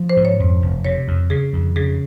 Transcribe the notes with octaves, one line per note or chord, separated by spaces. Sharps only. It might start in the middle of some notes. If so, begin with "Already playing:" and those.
Already playing: F3
C5
G#2
C#5
F2
F1
C3 C#5
F2
C#3 G#4
F2
C#3 G#4